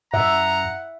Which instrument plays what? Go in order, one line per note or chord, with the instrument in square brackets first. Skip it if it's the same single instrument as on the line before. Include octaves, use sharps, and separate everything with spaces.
[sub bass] F#2 [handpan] E5 [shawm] F#5 [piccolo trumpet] A#5